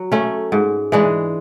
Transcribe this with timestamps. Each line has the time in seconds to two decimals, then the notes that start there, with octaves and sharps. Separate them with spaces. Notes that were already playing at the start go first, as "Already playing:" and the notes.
Already playing: F#3
0.12 A3 C#4
0.52 G#2
0.92 E3 G#3 D4